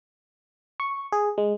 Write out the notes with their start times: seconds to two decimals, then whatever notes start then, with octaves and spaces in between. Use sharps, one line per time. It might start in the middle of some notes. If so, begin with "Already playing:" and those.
0.80 C#6
1.12 G#4
1.38 G#3